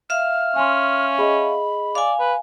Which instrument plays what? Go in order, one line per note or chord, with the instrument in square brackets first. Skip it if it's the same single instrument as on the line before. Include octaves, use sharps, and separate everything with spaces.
[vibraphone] E5 F5 [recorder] F6
[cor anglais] C#4 [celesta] G#5 C6
[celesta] G#4 D#5 [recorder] B5
[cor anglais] D5 [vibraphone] F5 G#5
[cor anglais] B4